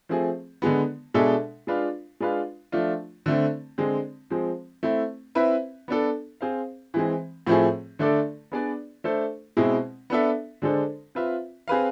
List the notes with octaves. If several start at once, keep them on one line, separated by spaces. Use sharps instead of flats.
F3 A3 C4 G#4
D3 G#3 B3
B2 G#3 D4 A4 E5
G#3 D4 F4 B4 F5
G#3 D4 F4 B4 F5
F3 A3 D4 F4
D3 A3 C4
D3 G#3 C4
F3 G#3 C4
A3 C4 E4
C4 E4 B4 E5
B3 D4 A4
C4 G#4 C5 F5
E3 G#3 C4
A2 F3 A3 C4 G#4
D3 A3 D4 A4 D5
B3 D4 G#4 B4 D5
A3 D4 A4 C5
B2 G#3 C4 E4
B3 D4 A4 E5
D3 G#3 D4 A4 C5
C4 F4 B4 E5
C4 G#4 B4 F5